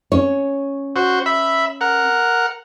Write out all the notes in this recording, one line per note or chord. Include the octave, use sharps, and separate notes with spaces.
C#4 C#5
F#4 C5
E5 B5
A#4 F#5